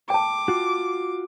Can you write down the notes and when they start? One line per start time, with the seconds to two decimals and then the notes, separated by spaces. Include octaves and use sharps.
0.10 G5 A5 D6
0.48 F4 F#4